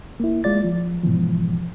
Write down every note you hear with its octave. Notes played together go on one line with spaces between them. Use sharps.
A#3 E4
G#3 F4 D5 A6
F3
G#2 B2 E3 F3